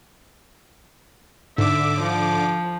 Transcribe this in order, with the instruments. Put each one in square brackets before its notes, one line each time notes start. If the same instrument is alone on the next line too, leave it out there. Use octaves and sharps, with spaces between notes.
[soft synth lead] G#2 [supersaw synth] D3 D6 [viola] E5
[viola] F3